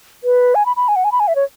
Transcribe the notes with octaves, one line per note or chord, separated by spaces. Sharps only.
B4
G#5
B5
B5
G#5
F#5
G#5
B5
G#5
E5
C#5